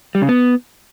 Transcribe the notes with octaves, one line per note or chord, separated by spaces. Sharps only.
G3
C#3
B3